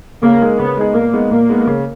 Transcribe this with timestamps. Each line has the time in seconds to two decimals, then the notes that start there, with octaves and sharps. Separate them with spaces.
0.23 C#3 A#3
0.41 G#3 D#4 G#4
0.59 C#3 B3
0.77 G#3 D#4 G#4
0.95 A#2 A#3
1.13 G#3 B3 D#4
1.31 A#2 A#3
1.49 G#3 B3 D#4
1.67 C#3